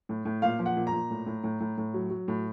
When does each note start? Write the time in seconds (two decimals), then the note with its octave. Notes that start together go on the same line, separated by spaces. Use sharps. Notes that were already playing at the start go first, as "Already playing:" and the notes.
0.09 A2
0.25 A2
0.42 A#2 F5
0.59 F3
0.66 F#5
0.77 A#2
0.87 A#5
0.93 A#2
1.10 A2
1.26 A2
1.44 A2
1.60 A2
1.78 A2
1.94 F#3
2.10 F#3
2.28 A2